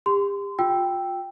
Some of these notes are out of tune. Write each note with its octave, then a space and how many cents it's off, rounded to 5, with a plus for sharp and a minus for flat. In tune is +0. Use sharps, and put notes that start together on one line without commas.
G4 +40 C6 -25
F4 +30 G5 +0 E6 +0